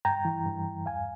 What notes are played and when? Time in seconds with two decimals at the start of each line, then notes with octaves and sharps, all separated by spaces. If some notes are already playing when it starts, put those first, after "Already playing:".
0.05 G2 G5 A#5
0.25 E3
0.45 G2
0.66 G2
0.86 E2 F5 G#5